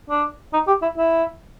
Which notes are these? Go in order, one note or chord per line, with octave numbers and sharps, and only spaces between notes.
D4
D#4
G4
E4
E4